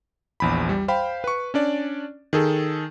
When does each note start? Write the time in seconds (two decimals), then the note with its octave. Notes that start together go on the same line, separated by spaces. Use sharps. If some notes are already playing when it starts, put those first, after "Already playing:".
0.40 A#1 E2 B5
0.69 G3
0.88 C5 F5 G5 B5
1.24 B4 C#6
1.54 C#4 D4 D5
2.33 D#3 G#4 A4